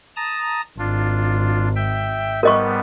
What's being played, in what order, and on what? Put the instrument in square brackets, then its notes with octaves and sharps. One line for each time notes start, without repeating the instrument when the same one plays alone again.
[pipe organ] A5 A#5 D#6
[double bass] G#1 [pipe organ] D4 F4
[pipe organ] E5 G5
[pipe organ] G#2 G3 B3 [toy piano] A#4 D#5 C#6